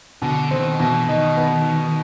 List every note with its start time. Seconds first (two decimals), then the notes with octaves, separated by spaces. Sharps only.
0.22 B2 D3
0.51 D#3 C4
0.79 B2 E3
1.08 D#3 D#4
1.37 B3